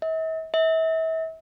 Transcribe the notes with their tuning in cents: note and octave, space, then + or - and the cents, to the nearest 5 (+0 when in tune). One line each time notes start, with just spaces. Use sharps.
E5 -45
E5 -35